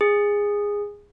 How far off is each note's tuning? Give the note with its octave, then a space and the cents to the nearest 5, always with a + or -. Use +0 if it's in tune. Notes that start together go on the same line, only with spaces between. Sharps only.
G#4 -15